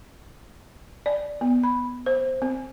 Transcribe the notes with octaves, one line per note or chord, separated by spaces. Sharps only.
D5
B3
B5
C5
C4